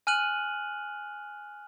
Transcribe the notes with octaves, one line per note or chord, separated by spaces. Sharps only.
G#5 F6 F#6 D#7 F#7